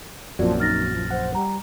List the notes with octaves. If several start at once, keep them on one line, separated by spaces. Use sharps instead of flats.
A#1 F#2 F3 A#3 C4 F#4 D5
D#4 F6 A6 A#6
F3
C5 F#5
G3 A#5